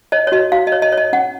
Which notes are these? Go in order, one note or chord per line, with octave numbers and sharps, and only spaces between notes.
C#5 D#5
C#5
F#4 D#5
F#4 F5
D#5
C#5
D#5
C#5
D#5
C#4 F#5